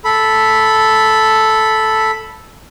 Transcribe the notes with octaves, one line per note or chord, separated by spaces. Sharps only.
A4 B5